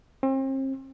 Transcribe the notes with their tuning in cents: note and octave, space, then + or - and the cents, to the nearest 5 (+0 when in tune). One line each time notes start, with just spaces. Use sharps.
C4 +40